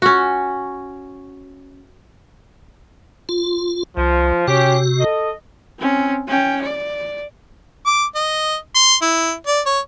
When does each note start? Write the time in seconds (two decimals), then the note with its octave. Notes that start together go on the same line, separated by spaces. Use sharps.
0.02 C#4 F#4
3.29 F4
3.97 C2 F3
4.48 C3 C#4 F#4 G4
5.00 A4 D#5
5.79 C4 C#4
6.28 C#4 G5
6.61 D5
7.86 D6
8.15 D#5
8.75 C6
9.02 E4
9.47 D5
9.66 C#5